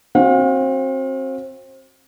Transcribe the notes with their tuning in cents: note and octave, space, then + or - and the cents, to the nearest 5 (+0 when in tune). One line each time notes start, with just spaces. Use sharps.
C4 +30 F#4 +0 F5 +35